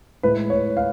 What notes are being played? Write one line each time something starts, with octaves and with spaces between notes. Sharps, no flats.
A2 G#3 B4
C#5
F5